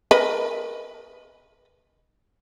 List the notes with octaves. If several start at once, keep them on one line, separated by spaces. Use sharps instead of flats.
A#4 B4 D#5